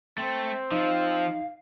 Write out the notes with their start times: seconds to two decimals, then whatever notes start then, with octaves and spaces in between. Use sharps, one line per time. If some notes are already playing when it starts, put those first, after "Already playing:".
0.18 A3 C4
0.72 F3 D#4 F5